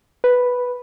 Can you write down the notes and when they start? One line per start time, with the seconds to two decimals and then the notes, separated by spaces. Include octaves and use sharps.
0.24 B4